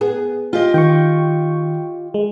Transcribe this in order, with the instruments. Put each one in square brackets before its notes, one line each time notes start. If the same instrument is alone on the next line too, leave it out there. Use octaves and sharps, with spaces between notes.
[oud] B3 G#4
[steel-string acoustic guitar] F4 G4 D#5
[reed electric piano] D#3 [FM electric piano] G5 C#6
[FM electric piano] G#3